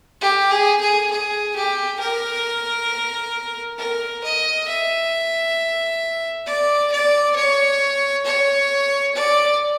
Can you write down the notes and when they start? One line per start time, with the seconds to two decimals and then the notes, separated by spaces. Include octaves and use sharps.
0.21 G4
0.51 G#4
0.80 G#4
1.11 G#4
1.56 G4
2.00 A#4
3.79 A#4
4.24 D#5
4.67 E5
6.46 D5
6.92 D5
7.36 C#5
8.25 C#5
9.15 D5